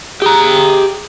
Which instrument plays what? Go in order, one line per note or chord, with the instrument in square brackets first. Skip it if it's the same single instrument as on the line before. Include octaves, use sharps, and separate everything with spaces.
[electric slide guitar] G4 A#5 [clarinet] G#4